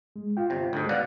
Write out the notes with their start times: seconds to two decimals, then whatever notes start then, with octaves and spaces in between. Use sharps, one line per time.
0.16 G#3
0.37 F4 G5
0.50 G1 C3
0.73 D2 G#2
0.89 B2 D5 F5 F#5